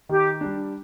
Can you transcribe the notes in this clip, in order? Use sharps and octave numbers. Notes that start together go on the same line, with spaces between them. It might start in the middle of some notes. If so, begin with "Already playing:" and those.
D#3 G4
G3 D4